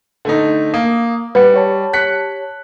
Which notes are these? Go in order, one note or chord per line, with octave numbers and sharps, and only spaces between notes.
D3 A3 D#4
A#3 D#6
G3 B4 F#5 C#7
G4 C#5 A5
F#6 B6 C#7